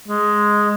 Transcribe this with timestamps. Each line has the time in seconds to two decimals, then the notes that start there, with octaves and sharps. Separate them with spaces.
0.08 G#3